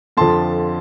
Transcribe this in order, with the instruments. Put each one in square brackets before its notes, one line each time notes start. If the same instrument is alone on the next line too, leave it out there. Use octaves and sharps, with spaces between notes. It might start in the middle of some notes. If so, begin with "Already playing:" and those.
[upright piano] F2 D3 F3 A5 C6